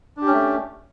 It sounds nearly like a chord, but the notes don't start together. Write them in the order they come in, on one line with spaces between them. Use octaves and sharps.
D4 G4 C#4 A3